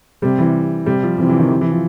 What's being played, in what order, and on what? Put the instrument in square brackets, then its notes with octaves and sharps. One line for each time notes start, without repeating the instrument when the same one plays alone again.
[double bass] C3 [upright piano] G3
[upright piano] E3
[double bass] C3 [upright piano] G3
[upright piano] F3
[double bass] C3 [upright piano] E3
[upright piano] E3
D#3
E3
E3
F3